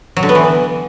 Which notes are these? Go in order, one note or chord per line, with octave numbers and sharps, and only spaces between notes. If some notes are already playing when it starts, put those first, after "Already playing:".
F#3
D3
B3
E3